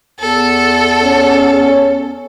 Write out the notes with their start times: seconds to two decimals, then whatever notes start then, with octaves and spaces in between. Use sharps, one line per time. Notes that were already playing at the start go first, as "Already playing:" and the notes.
0.20 E2 A4
1.04 C#4